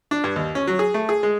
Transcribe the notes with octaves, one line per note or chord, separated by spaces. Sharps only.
D4
G2
D#2
C#4
F#3
G#4
A3
G#4
G#3